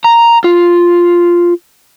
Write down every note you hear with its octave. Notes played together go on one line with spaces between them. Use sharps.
A#5
F4